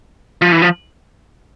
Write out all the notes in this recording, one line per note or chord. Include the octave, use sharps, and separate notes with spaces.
F3
E3
F3